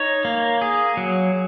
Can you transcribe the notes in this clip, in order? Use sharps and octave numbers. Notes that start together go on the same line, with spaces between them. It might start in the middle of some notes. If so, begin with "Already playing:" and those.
Already playing: D#4 C#5
A#3
G#4
F#3